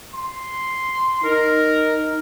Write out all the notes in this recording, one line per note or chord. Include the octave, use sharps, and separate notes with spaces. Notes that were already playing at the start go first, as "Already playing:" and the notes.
C6
D#4 A#4